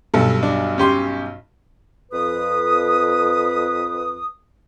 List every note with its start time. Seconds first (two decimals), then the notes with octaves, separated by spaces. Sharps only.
0.14 B1 G2 A4
0.43 D4
0.78 C#4 G4 C6
2.12 F2 B4 D#6